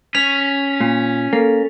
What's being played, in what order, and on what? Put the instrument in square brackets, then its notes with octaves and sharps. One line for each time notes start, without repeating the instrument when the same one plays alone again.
[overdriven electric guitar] C#4 [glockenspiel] B6 F7
[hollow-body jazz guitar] A#2
[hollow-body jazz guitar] A#3 [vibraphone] A4